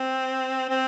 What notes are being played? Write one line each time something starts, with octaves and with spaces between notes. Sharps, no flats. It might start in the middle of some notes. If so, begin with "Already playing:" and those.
Already playing: C4
C4